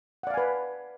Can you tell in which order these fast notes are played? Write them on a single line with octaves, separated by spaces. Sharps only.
F#5 D5 F5 G#5 B4